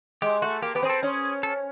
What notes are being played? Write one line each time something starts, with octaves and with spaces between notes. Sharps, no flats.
G#3 G4
A3 F#4
A#3 G4
B3 G4
C4 G#4
A4
C#4 G#4
A4